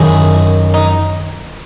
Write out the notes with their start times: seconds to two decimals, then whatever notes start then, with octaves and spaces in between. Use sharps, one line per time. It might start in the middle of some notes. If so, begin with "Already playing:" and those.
Already playing: F#2 D#3 E4 G#4
0.74 D#4